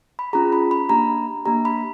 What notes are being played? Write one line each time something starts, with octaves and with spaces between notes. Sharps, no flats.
B5
C#4 F4 G#4 A#5
B5
B5
A#3 D4 G4 A#5
A#3 D4 G4 A#5
B5